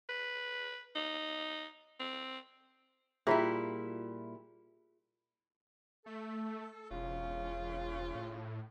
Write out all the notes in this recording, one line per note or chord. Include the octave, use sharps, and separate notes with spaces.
B4
D#4
C4
A#2 G3 E4 F4 G#4 E5
A3 A4
E1 C#3 C#4 F4
A2